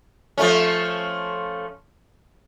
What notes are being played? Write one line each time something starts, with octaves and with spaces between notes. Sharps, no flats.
F3 A3 C#4